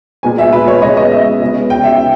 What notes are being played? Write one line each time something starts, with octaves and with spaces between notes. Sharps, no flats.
A#2 G#3 B3 G#5
E5
B4
C#5
C#3 G#3 B3 D#5
D#5
E5
C#3 G#3 B3
G5
E5
G5